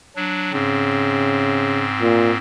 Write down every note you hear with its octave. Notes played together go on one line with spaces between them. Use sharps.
F#3 D4
G#2 C#3 C4
A#2